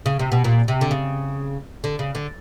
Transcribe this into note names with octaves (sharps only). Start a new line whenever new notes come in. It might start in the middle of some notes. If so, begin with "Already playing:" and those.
C#3
C3
B2
A#2
C3
D3
C#3
D3
C#3
D3